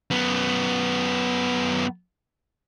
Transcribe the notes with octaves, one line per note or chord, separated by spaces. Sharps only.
F#2 B3